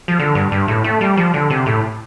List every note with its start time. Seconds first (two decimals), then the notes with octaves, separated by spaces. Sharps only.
0.08 F3
0.19 D3
0.35 G2
0.52 G2
0.68 A2
0.84 A3
1.01 G3
1.17 F3
1.34 D3
1.50 C3
1.66 A2